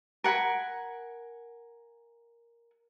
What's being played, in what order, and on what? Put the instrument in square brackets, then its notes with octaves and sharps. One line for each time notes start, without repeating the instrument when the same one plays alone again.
[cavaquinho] A#4 F#5 G#5 B5